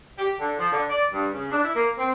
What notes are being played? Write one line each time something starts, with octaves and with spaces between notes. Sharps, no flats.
G4
D3
F3
D3
D5
G2
C#3
D4
E4
A#3
C4